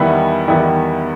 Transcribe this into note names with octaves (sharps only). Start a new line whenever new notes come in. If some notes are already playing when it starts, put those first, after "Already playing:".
Already playing: E2 D#3 G3 B3 E4
E2 D#3 G3 B3 E4